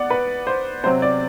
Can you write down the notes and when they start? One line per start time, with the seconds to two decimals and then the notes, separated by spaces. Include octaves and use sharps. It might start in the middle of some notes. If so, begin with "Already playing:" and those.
Already playing: B3 D5 F#5
0.10 B4
0.47 C5
0.84 C3 F#3 C4 C5
1.02 D5